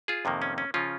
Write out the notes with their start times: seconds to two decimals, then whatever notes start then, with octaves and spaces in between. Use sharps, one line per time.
0.08 F4 G#4
0.25 F2 C3 D#3 A#3
0.42 C#4
0.58 C#4
0.74 C#3 F3 C#4 F4